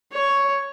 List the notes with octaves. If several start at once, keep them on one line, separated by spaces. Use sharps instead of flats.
C#5